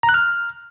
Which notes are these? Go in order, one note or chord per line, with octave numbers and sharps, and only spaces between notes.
A#5
F#6
F6